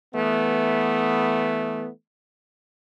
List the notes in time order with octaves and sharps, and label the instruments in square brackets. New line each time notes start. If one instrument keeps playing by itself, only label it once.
[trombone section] E3 A3 B3